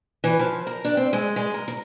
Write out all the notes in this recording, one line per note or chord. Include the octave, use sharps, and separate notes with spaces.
E3
F3
A#4
D4
C4
G#3
G#3
A#4
A#4